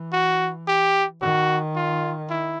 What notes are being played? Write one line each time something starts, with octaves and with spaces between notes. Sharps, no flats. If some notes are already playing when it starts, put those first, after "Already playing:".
Already playing: E3
F#4
G4
D#3 F#4
F4
E4